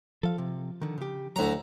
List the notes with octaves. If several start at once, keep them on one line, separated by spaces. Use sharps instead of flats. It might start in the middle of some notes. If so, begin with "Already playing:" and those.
F3 A4 F5
C3
D3 D#3
C#3 G4
D2 F#3 E4 A#5